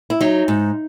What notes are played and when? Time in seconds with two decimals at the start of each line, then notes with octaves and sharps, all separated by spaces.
0.10 E4
0.21 F#3 D#4
0.48 G#2